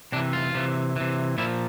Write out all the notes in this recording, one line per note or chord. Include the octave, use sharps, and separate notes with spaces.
C3 E3 D4
F4
C3 E3
C3 E3
A#2 F3 E4